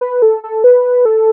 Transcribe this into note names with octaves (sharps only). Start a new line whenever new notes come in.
B4
A4
A4
B4
A4